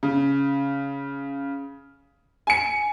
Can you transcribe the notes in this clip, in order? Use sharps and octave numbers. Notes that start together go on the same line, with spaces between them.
C#3
G#5 C#7